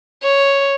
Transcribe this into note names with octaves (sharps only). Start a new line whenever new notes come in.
C#5